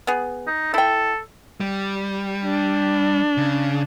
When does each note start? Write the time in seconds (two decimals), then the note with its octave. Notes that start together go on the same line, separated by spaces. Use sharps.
0.07 B3 G#4
0.47 D#4
0.74 E4 A4 G5
1.60 G3
2.46 D4
3.37 C#3